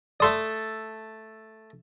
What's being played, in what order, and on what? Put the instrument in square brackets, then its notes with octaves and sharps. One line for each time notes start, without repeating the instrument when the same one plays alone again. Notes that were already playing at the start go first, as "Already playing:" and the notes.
[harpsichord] A3 A4 D#6 [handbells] D5 C6